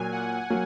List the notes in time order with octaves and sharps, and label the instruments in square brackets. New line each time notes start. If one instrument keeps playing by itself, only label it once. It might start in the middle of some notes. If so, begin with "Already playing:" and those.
Already playing: [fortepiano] A#2 F#3 A#3 [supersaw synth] G#5
[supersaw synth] F#5
[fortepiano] F#3 A#3